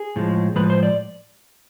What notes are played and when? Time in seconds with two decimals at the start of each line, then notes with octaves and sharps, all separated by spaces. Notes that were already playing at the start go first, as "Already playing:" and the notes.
Already playing: G#4
0.16 A2 F3 G#3
0.56 A2 F3 G#3 B4
0.70 C5
0.83 D5